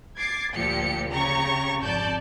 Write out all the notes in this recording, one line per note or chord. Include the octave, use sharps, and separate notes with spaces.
D6 G#6 A6 C7
D2 A#2 F3 G4 C#7
C#3 G4 A#5 C#6
G#1 F2 D5 A5 G6